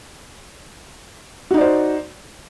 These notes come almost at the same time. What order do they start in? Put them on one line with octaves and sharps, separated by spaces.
F#4 D#4 D5 C5